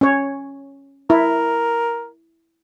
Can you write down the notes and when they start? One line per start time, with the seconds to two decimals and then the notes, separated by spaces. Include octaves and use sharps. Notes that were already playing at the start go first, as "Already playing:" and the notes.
0.01 C#4 C#5
1.10 E4 A#4